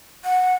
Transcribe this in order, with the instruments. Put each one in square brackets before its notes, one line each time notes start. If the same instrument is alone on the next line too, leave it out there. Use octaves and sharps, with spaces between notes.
[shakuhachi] F#5